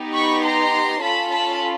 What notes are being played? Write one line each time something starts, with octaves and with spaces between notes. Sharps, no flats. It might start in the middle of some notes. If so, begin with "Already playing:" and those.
Already playing: B3 D#4 G4
B5 C#6
A#5 C6
C#4 F4 A4 A5 B5
A5 B5